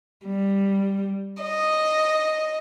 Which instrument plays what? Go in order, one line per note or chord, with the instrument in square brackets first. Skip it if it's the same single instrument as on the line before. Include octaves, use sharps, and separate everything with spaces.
[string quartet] G3
D#5